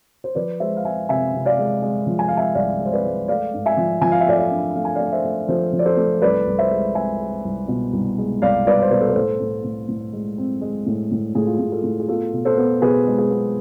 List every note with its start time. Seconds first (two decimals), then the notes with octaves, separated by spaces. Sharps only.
0.24 C5
0.35 F3 B4 D5
0.60 G#3 C5 E5
0.77 F5
0.84 G#3 E5 G#5
1.09 C3 E5 G#5
1.34 C3
1.45 D5 F5
1.58 G#3
1.82 G#3
2.07 F3
2.19 G#5
2.28 G#3 F5
2.37 E5 G#5
2.55 C2 D5 F5
2.79 G#3
2.86 C5
2.92 B4 D5
3.04 G#3
3.28 A3 D5 F5
3.54 G#2
3.66 E5 G#5
3.77 F3
4.02 F3 G#5
4.12 F5
4.21 E5
4.26 A3 D5 F5
4.38 D5 F5
4.51 D4
4.75 A3 F5
4.85 G#5
4.95 A3 D5 F5
5.12 C5 E5
5.24 A3
5.48 F3 A4 C5
5.73 F3
5.79 D5
5.85 A4 C5
5.97 A3
6.22 C2 B4 D5
6.46 C2
6.58 C5 E5
6.71 G#3
6.95 G#3 E5 G#5
7.20 G#3
7.44 C2
7.68 B2
7.93 C2
8.18 G#3
8.42 C2 D5 F5
8.66 C2 B4 D5
8.82 C5
8.90 B2 B4 D5
9.00 A4
9.08 B4
9.15 A2 A4 C5
9.40 A2
9.64 A2
9.88 A2
10.13 G#3
10.38 C4
10.61 G#3
10.86 A2
11.11 A2
11.35 A2 G#4
11.46 F4
11.57 A2 G#4
11.72 F4 A4
11.83 A2
12.00 G#4
12.08 B3 F4 A4
12.33 B2
12.45 A4 C5
12.57 B3
12.81 B2 G#4 B4
13.07 G#3
13.18 G#4
13.30 B3